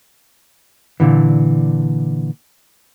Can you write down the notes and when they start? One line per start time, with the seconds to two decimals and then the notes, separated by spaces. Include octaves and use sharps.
1.00 A#2 D3 E3